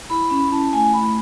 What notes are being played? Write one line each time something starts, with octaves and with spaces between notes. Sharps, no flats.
E4 B5
C#4 B5
E4 A5
A3 G#5
A3 B5